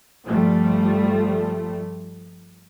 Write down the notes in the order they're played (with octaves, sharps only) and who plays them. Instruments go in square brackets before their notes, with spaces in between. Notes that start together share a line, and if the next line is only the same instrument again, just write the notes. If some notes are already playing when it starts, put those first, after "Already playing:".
[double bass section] G1 F3 G3 A3